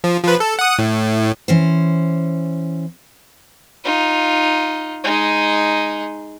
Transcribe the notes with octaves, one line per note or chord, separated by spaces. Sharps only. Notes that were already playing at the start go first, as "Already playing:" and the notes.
F3
F3 B4
A4
F#5 D#6
A2
E3 C#4 C5
D#4 F4
G#3 D#4